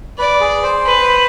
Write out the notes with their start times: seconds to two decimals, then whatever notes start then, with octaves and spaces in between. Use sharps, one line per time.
0.19 B4 D5
0.41 G#4
0.63 C5
0.86 B4